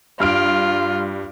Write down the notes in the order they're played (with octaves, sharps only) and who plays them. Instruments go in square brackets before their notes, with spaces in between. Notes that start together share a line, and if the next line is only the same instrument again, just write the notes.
[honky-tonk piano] G2 F6 D7 [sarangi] F4